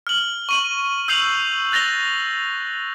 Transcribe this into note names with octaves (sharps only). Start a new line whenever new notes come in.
F6 F#7
C#6 D#7 F#7
E6 G6 C7 F7 F#7
F#6 A6 A#6 F7 G7